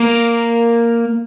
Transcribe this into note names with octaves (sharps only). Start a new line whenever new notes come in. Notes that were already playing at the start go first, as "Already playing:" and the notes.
Already playing: A#3